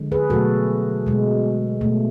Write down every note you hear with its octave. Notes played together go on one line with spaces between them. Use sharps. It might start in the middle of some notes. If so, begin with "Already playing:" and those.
Already playing: D3 F3 G#3
G#4 B4
B2 F#3 A3 F#4 A4
B2 G#3
B2 A3